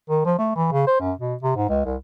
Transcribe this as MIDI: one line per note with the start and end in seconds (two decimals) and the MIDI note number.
0.10 0.22 51
0.26 0.37 53
0.39 0.52 57
0.56 0.71 52
0.72 0.82 49
0.87 1.01 72
1.01 1.13 42
1.19 1.35 47
1.43 1.55 48
1.56 1.68 44
1.69 1.84 37
1.85 1.96 36